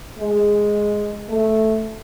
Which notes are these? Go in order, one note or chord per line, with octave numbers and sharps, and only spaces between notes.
G#3
A3